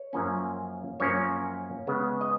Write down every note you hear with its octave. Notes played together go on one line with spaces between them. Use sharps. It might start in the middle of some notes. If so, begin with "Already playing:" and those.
Already playing: C#5
F#2 F3 A#3 C#4
F#2 F3 A#3 C#4 C#5
C#3 G#3 B3
D#5